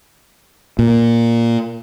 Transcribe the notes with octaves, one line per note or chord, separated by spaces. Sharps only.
A#2